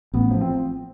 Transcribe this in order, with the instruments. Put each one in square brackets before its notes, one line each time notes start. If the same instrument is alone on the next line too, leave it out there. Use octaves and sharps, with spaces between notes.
[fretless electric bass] A1 [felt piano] B3
[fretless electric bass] F3
[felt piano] C4